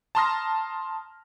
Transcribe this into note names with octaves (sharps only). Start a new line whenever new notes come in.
A5 A#5 C6 D#6 F6 A#6